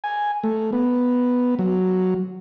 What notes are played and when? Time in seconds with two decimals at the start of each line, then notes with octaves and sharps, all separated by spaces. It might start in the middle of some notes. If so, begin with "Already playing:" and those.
0.04 G#5
0.44 A3
0.73 B3
1.59 F#3